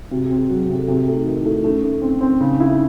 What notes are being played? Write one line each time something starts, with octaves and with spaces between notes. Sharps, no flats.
C3 F#4
G#4
C4
G#4
F#3 F#4
G#4
C3
A4
C3 F#4
G#4
A3
D#4
D#3 D#4
E4
A3
D#4
A3 C#4
A3
C4
C4
C#3 D#4
C#4
E4
D#4